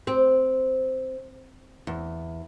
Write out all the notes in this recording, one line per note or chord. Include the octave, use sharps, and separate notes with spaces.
C4
E2